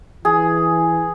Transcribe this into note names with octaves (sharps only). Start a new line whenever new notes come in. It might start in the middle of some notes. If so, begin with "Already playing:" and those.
E3 G#4